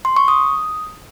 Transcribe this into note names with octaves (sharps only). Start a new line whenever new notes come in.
C6
C#6
D#6